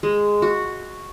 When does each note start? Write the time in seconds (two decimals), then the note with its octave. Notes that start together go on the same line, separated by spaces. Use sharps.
0.03 G#3
0.42 F#4